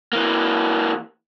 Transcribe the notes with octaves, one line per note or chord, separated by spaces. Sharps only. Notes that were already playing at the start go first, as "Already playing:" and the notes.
E3 A#3